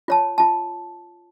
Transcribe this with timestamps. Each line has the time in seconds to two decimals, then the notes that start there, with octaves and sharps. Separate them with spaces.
0.08 F4 C#5 A5
0.38 F4 A5